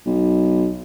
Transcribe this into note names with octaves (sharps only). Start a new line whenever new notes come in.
B1